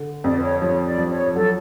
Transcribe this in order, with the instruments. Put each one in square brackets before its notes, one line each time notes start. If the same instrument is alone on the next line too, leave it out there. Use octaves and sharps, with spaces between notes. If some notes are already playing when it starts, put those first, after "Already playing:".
Already playing: [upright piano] D3
[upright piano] F2 [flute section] D5
[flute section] B4
C#5
[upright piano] F3 [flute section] C#5
[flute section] D5
[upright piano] F3
[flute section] C#5
[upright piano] F#3 [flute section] A4